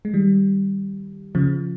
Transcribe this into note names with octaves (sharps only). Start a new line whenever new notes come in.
G#3
D#3 G3
C#3 F3